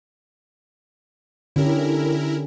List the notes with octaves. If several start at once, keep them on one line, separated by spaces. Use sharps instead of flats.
D3 C#4 E4 G4 A#4